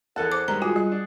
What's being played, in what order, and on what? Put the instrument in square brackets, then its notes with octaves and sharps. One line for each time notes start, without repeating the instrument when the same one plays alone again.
[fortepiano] E2 A4 A5 [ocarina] A#4 [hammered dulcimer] F#5
[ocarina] C5 [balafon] D6
[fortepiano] G2 D#3 G#3 [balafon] A#5
[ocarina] F4 [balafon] F#4 [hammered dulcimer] G#4
[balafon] G3 [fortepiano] F#6
[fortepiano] D4